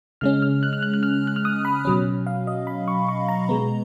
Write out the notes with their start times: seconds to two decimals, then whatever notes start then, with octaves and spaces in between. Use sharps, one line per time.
0.21 C#3 G#3 C#4 F6
0.42 F6
0.63 F#6
0.73 F6
0.83 F#6
0.94 F#6
1.03 F6
1.27 F#6
1.36 F6
1.45 D#6
1.65 B5
1.85 B2 F#3 C#4
2.27 F5
2.47 D#5
2.67 B5
2.88 C#6
3.08 C#6
3.28 A#5
3.49 B2 G#3 B3